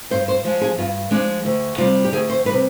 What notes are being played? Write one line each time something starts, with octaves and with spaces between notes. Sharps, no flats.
G2 C5
C5
F3 G#3
G#4
G2 F4
F3 G#3 D4
D2
C3 G3 F4
G4
D2 G#4
C5
C3 G3 B4